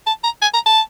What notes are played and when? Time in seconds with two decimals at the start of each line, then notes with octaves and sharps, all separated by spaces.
0.07 A5
0.24 A#5
0.42 G#5
0.54 A#5
0.66 A5